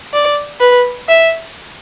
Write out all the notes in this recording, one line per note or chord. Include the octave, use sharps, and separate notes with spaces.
D5
B4
E5